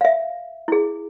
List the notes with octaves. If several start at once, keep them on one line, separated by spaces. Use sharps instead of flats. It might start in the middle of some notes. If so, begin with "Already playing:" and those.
E5 F5
E4 G#4